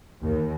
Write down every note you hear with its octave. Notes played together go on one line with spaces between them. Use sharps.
D#2